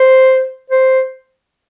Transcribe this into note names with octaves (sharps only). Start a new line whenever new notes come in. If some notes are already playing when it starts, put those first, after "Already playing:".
Already playing: C5
C5